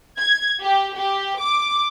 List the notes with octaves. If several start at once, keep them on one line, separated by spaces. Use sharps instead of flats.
G#6
G4
G4
D6